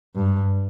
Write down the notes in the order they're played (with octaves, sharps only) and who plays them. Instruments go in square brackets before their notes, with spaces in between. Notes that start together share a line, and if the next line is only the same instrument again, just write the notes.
[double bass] G2